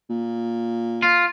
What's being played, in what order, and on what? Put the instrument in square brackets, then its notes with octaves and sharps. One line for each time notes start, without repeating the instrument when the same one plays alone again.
[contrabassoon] A#2
[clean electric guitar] F4